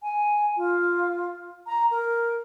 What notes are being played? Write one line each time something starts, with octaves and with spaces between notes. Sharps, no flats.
G#5
F4
A#5
A#4